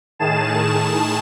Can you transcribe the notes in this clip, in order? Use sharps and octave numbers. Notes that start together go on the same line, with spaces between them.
A2 D#3 G#4 A5 E7